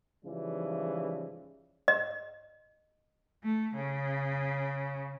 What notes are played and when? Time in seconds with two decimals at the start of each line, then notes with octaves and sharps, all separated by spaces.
0.25 G#2 C#3 E3 F3 G3
1.88 D#5
3.44 A3
3.75 C#3